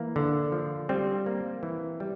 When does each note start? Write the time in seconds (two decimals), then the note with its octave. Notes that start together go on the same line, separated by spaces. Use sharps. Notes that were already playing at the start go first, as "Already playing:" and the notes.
Already playing: E3 A#3
0.16 D3
0.52 F3
0.89 G3 C4
1.26 A#3
1.63 E3
2.00 G3